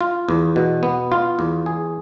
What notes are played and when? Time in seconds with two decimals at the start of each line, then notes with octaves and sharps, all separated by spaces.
0.01 F4
0.29 E2
0.56 B2
0.83 B3
1.12 F4
1.39 E2
1.66 G#4